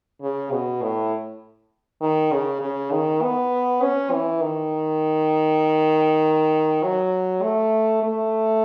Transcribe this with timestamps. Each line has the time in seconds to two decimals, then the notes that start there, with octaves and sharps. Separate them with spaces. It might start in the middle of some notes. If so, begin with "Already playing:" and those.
0.22 C#3
0.52 B2
0.82 A2
2.01 D#3
2.32 C#3
2.61 C#3
2.92 D#3
3.22 B3
3.82 C#4
4.12 E3
4.42 D#3
6.83 F#3
7.42 A3
8.03 A3